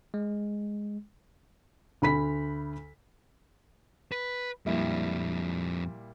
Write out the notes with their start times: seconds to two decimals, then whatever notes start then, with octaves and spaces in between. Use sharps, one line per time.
0.14 G#3
2.02 D2 B5 B6
4.12 B4
4.66 F2 A#2 G3 D4 E4